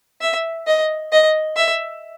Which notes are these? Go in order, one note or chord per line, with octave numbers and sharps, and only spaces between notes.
E5
D#5
D#5
E5